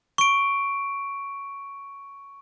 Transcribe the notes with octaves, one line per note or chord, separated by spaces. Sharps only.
C#6 D7